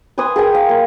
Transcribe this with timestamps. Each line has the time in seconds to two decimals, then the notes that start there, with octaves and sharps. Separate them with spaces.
0.18 B4 G#5 C6 D#6
0.36 G#4 A#4 G5 G#5
0.55 F5
0.69 A#3